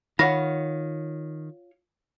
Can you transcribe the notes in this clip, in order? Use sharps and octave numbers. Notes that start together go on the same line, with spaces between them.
D#3 F4 C#5 F#5 B5 A#6